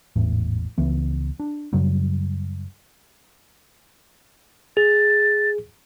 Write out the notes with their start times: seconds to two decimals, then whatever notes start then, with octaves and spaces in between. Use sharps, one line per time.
0.16 G#1 E2 A2
0.78 C#2 E3 B3
1.40 D4
1.73 F#2 C#3 F#3 G3
4.77 G#4 A6